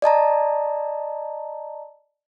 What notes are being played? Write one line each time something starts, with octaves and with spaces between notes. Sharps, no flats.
D5 D#5 A5 A#5